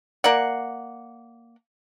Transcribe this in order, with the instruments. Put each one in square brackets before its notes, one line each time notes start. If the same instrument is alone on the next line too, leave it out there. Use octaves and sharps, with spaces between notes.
[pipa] A#3 D5 F#5